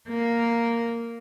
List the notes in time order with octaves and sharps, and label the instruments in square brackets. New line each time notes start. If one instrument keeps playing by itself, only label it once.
[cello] A#3